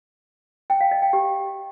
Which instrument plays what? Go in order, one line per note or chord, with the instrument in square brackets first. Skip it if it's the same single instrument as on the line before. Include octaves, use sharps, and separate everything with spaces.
[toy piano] G5
F5
D#5
G5
G4